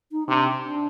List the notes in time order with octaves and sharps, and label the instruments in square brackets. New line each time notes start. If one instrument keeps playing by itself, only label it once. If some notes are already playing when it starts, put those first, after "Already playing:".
[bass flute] D#4
[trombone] C3 [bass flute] D4
[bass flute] D4